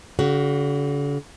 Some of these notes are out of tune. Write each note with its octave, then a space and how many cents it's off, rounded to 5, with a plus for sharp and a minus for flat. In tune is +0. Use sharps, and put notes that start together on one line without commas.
D3 -45 F#4 +20